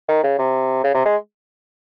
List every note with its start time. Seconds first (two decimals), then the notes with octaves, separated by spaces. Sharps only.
0.09 D#3
0.24 C#3
0.39 C3
0.84 C#3
0.94 C3
1.05 G#3